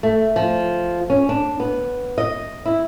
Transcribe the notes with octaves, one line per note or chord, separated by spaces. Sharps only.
A3
F3
C#4
D4
B3
D#5
E4